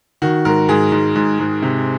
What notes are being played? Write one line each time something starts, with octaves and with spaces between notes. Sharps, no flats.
D#3 F#4
G#2 A#4
G#2 G#4
G#2
G#2
G#2
C3